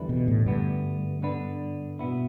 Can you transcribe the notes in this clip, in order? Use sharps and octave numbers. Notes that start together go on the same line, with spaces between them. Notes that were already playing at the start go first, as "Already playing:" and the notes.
Already playing: E2 D3 G3 E4 B4
B2
A2
D2 G2 D3 B3 D4
D3 B3 D4 B4
B2 B3 E4